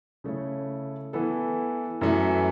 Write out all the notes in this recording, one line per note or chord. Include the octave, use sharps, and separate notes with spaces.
C#3 A3 E4 C#5
E3 B3 E4 A4
F#2 E3 A3 E4